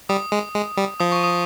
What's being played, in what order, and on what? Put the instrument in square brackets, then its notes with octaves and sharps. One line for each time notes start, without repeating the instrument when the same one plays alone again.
[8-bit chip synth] G3 [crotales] D#6
[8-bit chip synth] G#3
G#3
G3
[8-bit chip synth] F3 [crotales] D#6
[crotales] C#6
D#6